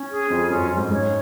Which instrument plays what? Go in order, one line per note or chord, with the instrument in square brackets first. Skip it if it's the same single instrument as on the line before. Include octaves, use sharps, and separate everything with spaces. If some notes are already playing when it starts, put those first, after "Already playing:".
Already playing: [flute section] C#4
G#4
[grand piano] F2 [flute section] F4
[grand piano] F#2 [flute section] C#4
[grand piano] F#2
[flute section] C#4
[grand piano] G#2
[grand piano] G#2 [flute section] C#5